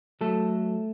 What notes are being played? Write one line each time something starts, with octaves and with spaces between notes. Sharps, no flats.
F#3 A3 A4